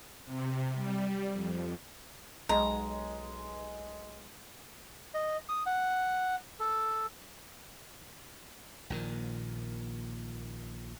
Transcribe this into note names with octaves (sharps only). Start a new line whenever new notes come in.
C3
G3
F2
B1 G#3 A#5
D#5
D#6
F#5
A4
A#1 A#2 D#3